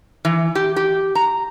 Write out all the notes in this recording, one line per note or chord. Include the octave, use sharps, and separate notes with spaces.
E3
G4
G4
A#5